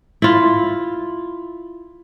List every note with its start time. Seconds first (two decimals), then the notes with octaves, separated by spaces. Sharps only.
0.22 E4 F4